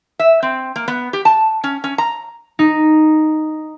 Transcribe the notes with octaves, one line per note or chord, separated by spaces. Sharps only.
E5
C4
A#3
B3
G4
A5
C#4
C#4
A#5
D#4